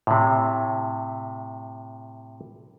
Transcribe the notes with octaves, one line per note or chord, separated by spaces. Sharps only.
A2 C3